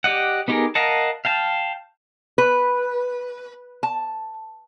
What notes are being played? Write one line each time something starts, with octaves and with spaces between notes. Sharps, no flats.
G4 D5 D#5 F#5
B3 D#4 G4 G#4 A#4
A#4 D#5 F5 F#5 A5
F5 G5 A5
B4
A5